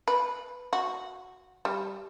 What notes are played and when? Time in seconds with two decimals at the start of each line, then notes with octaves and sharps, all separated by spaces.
0.08 B4
0.73 F#4
1.65 G3